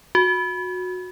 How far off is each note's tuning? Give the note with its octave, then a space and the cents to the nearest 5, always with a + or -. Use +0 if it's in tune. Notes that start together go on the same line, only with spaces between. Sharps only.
F#4 -20